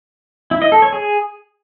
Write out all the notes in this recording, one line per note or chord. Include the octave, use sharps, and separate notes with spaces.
E4
D#5
A4
C#5
G#4